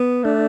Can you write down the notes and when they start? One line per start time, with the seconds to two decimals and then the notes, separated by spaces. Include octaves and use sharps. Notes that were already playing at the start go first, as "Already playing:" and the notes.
Already playing: B3
0.24 A3 D4